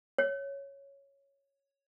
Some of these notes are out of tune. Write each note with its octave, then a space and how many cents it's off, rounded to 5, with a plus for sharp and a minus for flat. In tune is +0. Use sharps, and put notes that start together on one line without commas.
C#5 +0